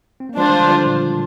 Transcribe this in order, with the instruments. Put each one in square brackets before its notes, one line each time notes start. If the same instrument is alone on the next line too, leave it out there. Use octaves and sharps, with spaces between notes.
[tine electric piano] C4
A#3
[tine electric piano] F3 G#3 [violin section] D4 F4 C5
[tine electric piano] D#3 G3
D3 F3
D3 F3
A#2
A#2